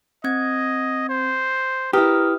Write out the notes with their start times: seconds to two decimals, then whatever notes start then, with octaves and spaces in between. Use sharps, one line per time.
0.24 C4 D#5 G#6
1.09 C5
1.93 E4 G4 A#4 B4 D#6 F6